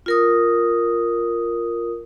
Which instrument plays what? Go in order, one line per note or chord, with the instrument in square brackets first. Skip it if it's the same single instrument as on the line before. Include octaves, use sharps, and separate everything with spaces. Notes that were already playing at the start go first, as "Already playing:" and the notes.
[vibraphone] F4 A#4 D#6